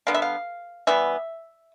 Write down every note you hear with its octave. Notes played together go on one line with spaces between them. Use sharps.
D3 G3 B3 F5
E5
F5
E3 G3 B3 E5